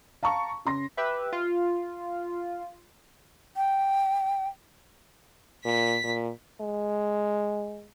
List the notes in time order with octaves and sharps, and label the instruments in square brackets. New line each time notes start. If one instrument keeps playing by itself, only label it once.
[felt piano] F5 A5 A#5 C#6
C#3 C6 A#6
[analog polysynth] G4 B4 E5
F4
[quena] G5
[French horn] A#2 [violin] B6
[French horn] A#2
[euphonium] G#3